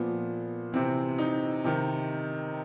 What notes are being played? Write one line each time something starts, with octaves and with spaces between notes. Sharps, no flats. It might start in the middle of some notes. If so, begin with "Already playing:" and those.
Already playing: A#2 F3 B3
C3 E3 C4
D#4
C3 D#3